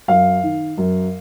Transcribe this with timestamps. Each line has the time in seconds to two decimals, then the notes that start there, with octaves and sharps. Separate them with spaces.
0.08 F#2 F5
0.43 D#3
0.77 F#2